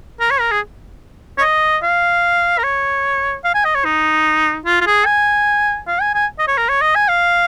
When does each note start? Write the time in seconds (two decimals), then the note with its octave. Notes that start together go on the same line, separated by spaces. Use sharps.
0.20 A#4
0.31 C#5
0.40 A#4
0.51 G#4
1.38 C#5
1.41 D#5
1.82 F5
2.58 A#4
2.64 C#5
3.44 F5
3.54 G#5
3.65 D#5
3.75 C#5
3.85 D#4
4.65 F4
4.81 F4
4.87 G#4
5.06 G#5
5.87 F5
6.01 G#5
6.14 G#5
6.39 D#5
6.48 C#5
6.58 A#4
6.69 C#5
6.81 D#5
6.95 G#5
7.08 F5